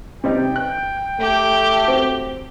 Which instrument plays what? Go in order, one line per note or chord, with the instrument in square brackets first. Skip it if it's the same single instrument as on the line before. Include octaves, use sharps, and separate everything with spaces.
[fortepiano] C3 G3 D#4 [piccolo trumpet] G5
[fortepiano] F#6
[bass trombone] A3 [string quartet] G4
[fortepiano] C4 F#4